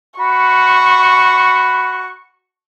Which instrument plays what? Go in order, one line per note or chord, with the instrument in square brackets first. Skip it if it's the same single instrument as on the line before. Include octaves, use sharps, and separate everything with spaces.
[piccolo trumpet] F#4 [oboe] B5 [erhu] C#6